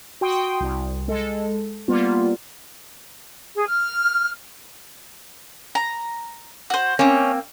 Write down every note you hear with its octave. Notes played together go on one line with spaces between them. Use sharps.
F#4 G5 C6 D#6
C2
G#3 A4
G3 A#3 B3 F4
G#4
F6
A#5
F#4 C5
A#3 C4 C#4